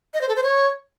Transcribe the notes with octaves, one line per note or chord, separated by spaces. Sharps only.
D#5
C5
A4
C5
C#5